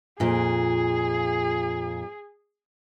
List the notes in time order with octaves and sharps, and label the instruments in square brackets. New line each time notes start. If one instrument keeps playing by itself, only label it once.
[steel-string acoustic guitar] F2 A#2 [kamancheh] G#4